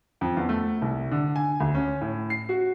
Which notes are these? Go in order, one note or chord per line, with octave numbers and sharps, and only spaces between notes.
F2
E2
A3
C2
D3
G#5
D2
C#4
A2
C7
F#4